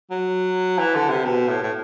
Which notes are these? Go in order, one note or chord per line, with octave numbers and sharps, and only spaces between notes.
F#3
E3
D3
C3
B2
A2
A2